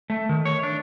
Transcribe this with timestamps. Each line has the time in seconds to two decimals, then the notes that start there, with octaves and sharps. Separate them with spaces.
0.10 A3
0.29 D#3
0.45 C#5
0.63 D4